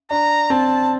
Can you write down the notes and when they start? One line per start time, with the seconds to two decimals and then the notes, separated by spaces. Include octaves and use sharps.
0.11 D4 A#5
0.50 C4 A5